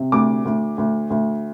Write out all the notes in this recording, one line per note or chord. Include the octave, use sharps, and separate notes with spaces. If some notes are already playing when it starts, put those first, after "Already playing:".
Already playing: C3
D2 D6
D2
D2
D2